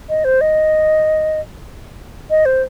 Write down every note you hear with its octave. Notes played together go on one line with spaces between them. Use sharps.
D#5
C5
D#5
D#5
C5